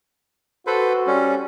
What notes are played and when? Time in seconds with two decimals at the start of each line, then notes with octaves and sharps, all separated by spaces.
0.67 F#4 A4 B4 C5
1.07 G3 C#4